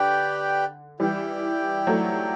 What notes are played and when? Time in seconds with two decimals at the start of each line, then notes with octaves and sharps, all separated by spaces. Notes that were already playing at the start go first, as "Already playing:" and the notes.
Already playing: D3 G4 B4 D5 G5
0.99 E3 G3 E4 G4 D5 G5
1.87 F#3 A3